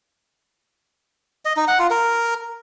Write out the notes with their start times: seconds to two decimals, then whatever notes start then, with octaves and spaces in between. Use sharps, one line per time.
1.45 D#5
1.56 D#4
1.68 F#5
1.79 F4
1.90 A#4